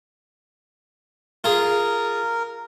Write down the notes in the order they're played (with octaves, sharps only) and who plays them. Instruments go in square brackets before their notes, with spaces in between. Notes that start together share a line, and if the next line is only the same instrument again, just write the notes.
[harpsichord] F4 G#4 [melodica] A#4